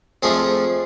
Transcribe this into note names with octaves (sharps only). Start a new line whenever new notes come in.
F2 F3 A3 G#4